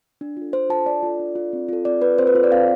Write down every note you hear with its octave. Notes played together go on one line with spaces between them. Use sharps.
D4
F4 A4
D4 C5
F4 A4 A5
D4 D5
F4 A4
D4
F4 A4
C4
F4 A4
C4 D5
F4 A4 B4
C4 C5
B4
F4 A4 C5
D5
C4 F5